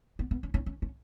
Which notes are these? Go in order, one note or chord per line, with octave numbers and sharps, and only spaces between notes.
B3
B3
C#4
C#4
C#4
C#4